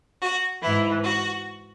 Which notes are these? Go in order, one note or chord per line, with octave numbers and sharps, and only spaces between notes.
F#4
G#2 E3 E4
F#4